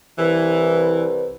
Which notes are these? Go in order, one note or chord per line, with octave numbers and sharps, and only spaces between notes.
C2 E3 B4